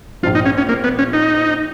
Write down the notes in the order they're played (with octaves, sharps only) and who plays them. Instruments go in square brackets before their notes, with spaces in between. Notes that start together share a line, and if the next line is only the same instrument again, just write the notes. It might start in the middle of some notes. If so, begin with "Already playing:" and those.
[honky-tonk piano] A#1 A#2 F3 [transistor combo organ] F4
[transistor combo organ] D#4
C#4
C#4
A#3
B3
C#4
D#4